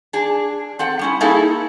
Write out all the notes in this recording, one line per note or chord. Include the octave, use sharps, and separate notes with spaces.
D4 G#4
C4 A4 F#5
G3 C#4 E4
A#3 D#4 E4 G#4 A4